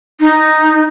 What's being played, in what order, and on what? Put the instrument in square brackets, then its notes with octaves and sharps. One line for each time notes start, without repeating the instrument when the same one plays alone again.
[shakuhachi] D#4